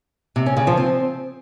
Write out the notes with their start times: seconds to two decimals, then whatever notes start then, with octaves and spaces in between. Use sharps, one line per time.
0.36 C3
0.46 C#4
0.57 C#3
0.67 F3
0.77 C4